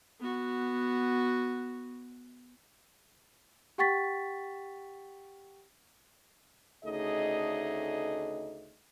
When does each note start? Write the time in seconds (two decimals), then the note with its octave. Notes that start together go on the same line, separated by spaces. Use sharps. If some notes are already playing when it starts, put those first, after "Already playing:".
0.20 B3 F#4
3.78 G4 F#5 G5 C#6 A6 B6
6.84 D2 C#3 A3 D#4 G#4 D#5